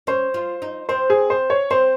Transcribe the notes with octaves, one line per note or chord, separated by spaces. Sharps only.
C#4 C5
F4
D#4
C4 C5
G#4
C5
C#5
C4 C5